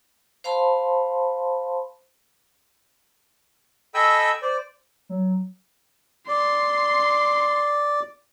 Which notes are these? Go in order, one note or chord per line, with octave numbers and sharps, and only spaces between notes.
C5 F5 A5 B5 C6
A4 D#5 G5 G#5 B5 E6
C5 D5
F#3
D5 C6